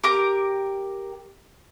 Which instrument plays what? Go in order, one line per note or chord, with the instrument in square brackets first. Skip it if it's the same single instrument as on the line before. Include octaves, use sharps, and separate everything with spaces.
[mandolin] G4 A#4 D6